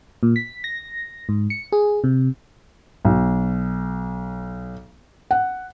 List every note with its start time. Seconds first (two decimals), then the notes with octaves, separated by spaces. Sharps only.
0.23 A#2
0.36 B6
0.64 A#6
1.29 G#2
1.50 C#7
1.72 G#4
2.04 C3
3.05 B1
5.31 F#5